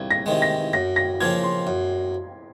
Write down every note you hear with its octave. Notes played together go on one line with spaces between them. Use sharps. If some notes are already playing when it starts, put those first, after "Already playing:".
Already playing: C2 G#6
A#6
C3 D#3 G#3
A#6
F#2 A#6
A#6
C#3 F3 A#3 F4 G#6
C6
F#2